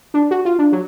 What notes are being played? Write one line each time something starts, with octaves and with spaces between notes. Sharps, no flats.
D4
F#4
F4
D4
F#3